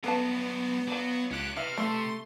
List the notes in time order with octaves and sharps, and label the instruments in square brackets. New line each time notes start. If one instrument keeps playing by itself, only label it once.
[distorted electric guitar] G2 F#3 [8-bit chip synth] B3 [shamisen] A4 B4 A5
[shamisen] F3 D4 [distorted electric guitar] F#3
[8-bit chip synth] C#2 F#6 [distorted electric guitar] C#4 G4
[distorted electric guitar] C3 [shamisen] E3 E5 [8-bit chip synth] F6
[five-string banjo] A3 [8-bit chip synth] C6